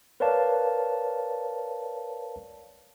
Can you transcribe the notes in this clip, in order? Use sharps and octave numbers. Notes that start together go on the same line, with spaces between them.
A#4 B4 C#5 D5 F5 A5